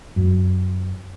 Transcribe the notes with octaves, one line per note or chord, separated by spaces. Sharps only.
F#2